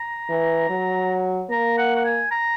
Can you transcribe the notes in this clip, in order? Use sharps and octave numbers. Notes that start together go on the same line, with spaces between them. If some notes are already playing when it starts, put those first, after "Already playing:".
Already playing: A#5
E3
F#3
A#3 A#5
F#5
F#5
G#5
A#5